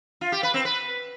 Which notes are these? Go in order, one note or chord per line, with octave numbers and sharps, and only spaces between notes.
F4
G4
B4
C4
B4